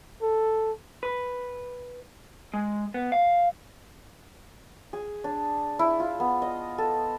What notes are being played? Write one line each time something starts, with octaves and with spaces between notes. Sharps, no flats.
A4
B4
G#3
B3
F5
G#4
D4
E4
F4
B3
D#5
A4